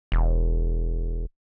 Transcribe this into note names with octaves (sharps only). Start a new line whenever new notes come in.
E1